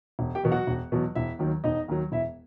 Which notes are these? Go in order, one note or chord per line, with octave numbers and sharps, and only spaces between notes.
E1
G4 G5
E2 B2 F#3
F#4 F#5
E1
E2 B2 F#3
E1 E4 E5
D#2 D#3 F#3
E1 D#4 D#5
D#2 D#3 F#3
E1 E4 E5